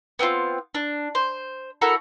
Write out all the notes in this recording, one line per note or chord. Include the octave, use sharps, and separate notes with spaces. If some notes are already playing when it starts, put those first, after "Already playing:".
B3 C4 E4 F4
D4
C5
E4 F#4 A4 A#4